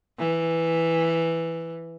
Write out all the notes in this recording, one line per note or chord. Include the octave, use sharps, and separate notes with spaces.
E3